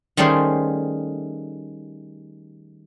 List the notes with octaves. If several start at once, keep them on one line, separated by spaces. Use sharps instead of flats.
D#3 G3 A3 C#4 G#4 C5